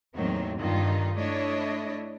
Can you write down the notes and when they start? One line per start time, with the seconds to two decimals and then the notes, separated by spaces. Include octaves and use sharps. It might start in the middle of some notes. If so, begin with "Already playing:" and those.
0.15 E2 A2 D#3 F#3 A#3 C4
0.58 G2 D3 D#3 D#4 F4
1.15 A3 D4 E4 C#5 D#5